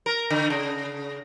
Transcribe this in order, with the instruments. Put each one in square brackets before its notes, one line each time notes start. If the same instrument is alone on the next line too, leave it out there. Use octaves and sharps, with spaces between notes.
[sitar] A#4
D3
C#3